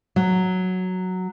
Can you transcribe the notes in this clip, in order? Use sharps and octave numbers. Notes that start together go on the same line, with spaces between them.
F#3